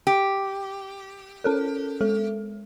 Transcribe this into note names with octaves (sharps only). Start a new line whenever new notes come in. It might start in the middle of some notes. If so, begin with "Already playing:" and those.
G4
C#4 A4 A#4
G#3 A4